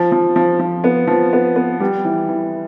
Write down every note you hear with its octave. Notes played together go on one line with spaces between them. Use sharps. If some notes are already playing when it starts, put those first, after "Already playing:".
Already playing: F3
F3
F3
F3
B3
F3
B3
B3
G3
E3
E3